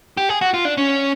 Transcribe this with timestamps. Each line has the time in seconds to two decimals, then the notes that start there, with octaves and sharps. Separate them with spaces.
0.17 G4
0.29 G#4
0.41 F#4
0.54 F4
0.65 D4
0.77 C#4